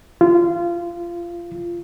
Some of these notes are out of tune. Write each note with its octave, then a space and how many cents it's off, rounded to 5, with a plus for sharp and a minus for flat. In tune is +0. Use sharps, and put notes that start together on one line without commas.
F4 -20